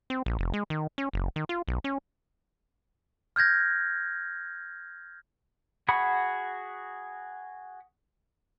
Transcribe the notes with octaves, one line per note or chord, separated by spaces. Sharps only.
C4
A#1
F1
G#3
D#3
C#4
F#1
D#3
F4
B1
C#4
F6 G6 G#6 A#6
F#4 G#4 F#5 B5 C#6